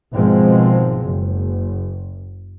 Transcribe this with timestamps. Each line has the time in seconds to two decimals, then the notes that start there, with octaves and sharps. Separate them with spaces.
0.13 G#1 B2 F3 G#3 C4
1.02 F#1